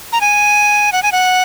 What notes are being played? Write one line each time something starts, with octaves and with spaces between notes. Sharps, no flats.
A#5
G#5
F#5
G#5
F#5